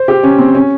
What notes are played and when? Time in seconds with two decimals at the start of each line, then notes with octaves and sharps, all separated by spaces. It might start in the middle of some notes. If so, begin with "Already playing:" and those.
Already playing: C5
0.08 G4
0.23 C#4
0.38 C4
0.55 C#4